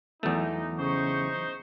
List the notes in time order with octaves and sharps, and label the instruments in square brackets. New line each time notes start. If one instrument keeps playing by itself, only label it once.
[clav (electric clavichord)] E2 A3 [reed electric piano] E3 F#3 B3 [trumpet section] D#4
[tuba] C#3 [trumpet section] D#4 C5 C#6